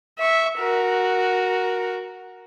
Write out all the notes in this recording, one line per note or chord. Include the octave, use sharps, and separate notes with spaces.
E5 C#6
F#4 A#4